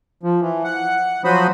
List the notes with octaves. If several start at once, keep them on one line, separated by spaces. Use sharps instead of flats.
F3
E3
F#5
F3 F#3 F#4 C5 B5 D#6